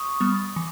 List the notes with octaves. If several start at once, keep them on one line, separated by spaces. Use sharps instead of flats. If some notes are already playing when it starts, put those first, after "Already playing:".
Already playing: C#6 D#6
G3 B3
E3